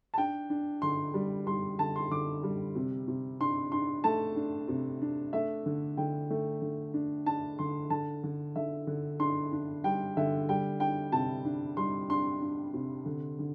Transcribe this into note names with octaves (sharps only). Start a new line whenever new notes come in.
A5
D4 G5
D4
D3 C6
G3
G3 C6
D3 A5
C6
D3 D6
G3
C3
C3
D4 C6
D4 C6
A3 A5
D4
C3
D4
A3 E5
D3
D3 G5
A3
D3
D4
D4 A5
D3 C6
D3 A5
D3
D3 E5
D3
D4 C6
D4
G3 G5
D3 E5
G3 G5
D4 G5
C3 A5
D4
G3 C6
D4 C6
D4
C3
D3
D3